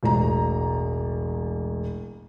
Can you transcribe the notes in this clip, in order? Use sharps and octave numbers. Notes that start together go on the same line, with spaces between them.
E1 A1 A#5